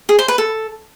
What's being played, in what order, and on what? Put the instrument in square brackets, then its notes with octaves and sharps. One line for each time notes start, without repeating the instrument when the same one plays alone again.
[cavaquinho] G#4
C5
B4
A4